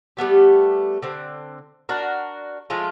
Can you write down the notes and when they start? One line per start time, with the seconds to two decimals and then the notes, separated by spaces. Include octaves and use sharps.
0.17 G3 A3 B3 G4
1.02 D3 C4
1.89 D4 F#4 A#4
2.70 F3 G#3 A3 F4